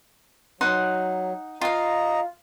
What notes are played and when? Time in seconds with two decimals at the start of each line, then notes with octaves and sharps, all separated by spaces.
0.61 F#3 D#4 F#5 C6
1.61 F4 D#5 F5 A#5